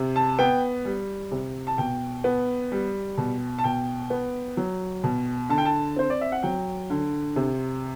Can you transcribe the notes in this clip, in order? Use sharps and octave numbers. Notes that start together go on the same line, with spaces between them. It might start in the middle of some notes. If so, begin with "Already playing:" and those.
Already playing: C3
A5
B3 G5
G3
C3
A5
B2 G5
B3
G3
B2
A5
B2 G5
B3
F#3
B2
D3 A5
G5
A5
C4 C5
D5
E5
F#5
F#3 G5
D3
C3